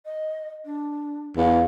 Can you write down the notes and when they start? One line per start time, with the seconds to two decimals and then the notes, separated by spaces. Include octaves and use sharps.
0.05 D#5
0.64 D4
1.37 E2 F5